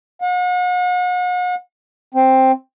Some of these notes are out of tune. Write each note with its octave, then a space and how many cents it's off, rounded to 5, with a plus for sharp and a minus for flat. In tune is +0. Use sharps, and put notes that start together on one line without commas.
F#5 -40
C4 +5